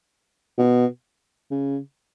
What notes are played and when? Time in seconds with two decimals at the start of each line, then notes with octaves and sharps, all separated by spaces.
0.58 B2
1.50 C#3